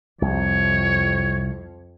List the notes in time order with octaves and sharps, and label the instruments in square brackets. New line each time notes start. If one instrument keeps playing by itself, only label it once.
[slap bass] C2 [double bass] F2 [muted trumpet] C#5